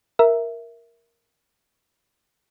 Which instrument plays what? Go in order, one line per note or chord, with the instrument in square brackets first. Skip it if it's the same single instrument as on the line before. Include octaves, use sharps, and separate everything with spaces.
[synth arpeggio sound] A#4 E5